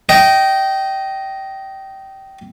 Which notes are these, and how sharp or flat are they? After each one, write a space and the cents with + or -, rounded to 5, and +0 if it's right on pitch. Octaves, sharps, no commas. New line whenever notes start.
D#5 +0 G5 -20